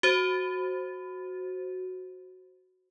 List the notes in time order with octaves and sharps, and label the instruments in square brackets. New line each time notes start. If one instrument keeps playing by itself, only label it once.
[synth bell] F#4 C5